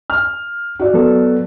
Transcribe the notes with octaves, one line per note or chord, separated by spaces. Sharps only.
F6
F#4 D5
F#3 B3 A4